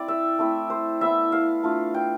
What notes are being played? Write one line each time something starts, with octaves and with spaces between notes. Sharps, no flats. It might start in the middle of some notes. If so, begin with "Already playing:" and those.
Already playing: C4 E4 D5
E5
A3 C4 E4
C5
B3 E4 E5
F5
A3 D4 F4
G5